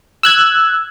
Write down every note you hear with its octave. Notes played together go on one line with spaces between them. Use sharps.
E6 F#6 G#6